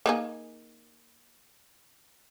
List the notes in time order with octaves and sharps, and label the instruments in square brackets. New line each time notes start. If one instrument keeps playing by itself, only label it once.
[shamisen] A#3 D#4 G#4